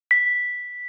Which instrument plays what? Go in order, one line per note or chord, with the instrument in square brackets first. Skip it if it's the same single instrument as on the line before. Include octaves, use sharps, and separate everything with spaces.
[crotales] B6